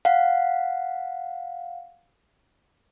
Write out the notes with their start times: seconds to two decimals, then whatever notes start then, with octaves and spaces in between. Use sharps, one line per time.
0.05 F5 F#5